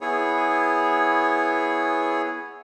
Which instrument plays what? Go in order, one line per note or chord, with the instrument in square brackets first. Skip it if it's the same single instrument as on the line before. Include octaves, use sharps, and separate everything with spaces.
[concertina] B3 E4 G#4 C#5